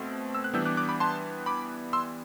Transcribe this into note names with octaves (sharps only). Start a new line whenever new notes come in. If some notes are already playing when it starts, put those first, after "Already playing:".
Already playing: B2 A3 C4
E6
F#6
E3 G3 B3 D4 E6 G6
D6 F#6
D6 F#6
B5 D6
A5 C6
B5 D6
C6 E6